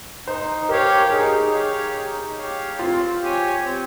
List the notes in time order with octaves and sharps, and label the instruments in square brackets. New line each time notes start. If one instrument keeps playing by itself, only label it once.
[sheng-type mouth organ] D#4 [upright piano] C5
[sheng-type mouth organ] G4 C#5 F5 [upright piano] A#4
[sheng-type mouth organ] D#4 [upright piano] G#4
[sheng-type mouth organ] G4 C#5 F5
D#4
G4 C#5 F5
[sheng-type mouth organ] C4 [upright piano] F4
[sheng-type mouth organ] G4 C#5 G#5
C4